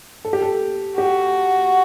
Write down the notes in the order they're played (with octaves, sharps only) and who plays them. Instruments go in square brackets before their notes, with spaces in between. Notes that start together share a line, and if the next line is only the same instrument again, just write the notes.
[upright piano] A4
G4
A4
[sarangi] F#4 [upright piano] G4